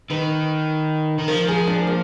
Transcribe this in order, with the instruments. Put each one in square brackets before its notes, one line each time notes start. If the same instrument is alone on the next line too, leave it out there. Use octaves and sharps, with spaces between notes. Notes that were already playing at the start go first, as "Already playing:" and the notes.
[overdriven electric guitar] D#3 [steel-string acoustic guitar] B4
[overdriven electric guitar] D#3
[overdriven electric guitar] F3 [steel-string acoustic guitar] A#4
[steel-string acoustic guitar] G#4
D4
A#3